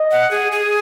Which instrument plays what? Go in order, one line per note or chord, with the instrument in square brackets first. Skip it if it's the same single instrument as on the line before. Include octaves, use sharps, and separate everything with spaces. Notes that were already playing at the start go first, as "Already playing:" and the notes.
Already playing: [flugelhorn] D#5
[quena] F#5
G#4
G#4